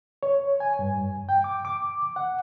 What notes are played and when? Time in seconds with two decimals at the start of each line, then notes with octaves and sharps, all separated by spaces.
0.23 C#5
0.60 G#5
0.79 G2
1.29 G5
1.44 D6
1.65 D6
2.16 F#5